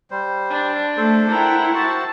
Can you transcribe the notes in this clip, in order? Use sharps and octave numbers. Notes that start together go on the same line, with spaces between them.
G3 C5
D4
A3 A4 C5
E4 A#4 F#5 G5
F#4 C5 A5 E6